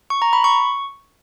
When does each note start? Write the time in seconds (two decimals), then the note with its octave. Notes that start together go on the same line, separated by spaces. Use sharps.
0.10 C#6
0.22 A#5
0.33 B5
0.44 C#6